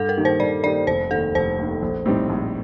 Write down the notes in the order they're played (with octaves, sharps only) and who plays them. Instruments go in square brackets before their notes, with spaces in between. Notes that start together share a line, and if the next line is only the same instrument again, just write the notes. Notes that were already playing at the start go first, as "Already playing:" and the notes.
Already playing: [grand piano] G2 [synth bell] A4
[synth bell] A#4
[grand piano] D#3 A#3 D#4 G4
[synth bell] C5
[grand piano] G2 [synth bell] D5
[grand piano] D#3 A#3 D#4 G4 [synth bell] D5
[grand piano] F1 [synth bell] C5
[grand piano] D#2 D#3 [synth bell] A4
[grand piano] F1 [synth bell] C5
[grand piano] D#2 D#3
A#1
A2 G3 C4 D#4
A#1